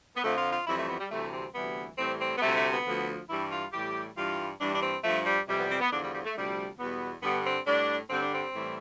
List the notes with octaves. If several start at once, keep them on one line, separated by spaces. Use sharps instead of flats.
B3
F2 D3 F3 A3
F4
F4
F2 E3 G3 E4
A3
B3
G3
D2 C3 E3 G3 A3
C4
D2 C3 E3 G3 B3
A2 E3 G3 C4
C4
B3
D2 C3 G3 A3
A3
B3
D2 D3 F3
G2 E3 G3 E4
F4
A2 E3 G3 G4
G2 E3 G3 F4
G2 E3 G3 D4
D4
C4
G2 F3 A3
G3
F2 C3 E3 G3
B3
C4
B3
E2 D3 F3 D4
G3
G3
A3
D2 C3 F3 G3
E2 B2 G3 B3
G2 D3 G3 B3
C4
A2 G3 D4
G2 D3 G3 C4
D4
C4
A2 E3 G3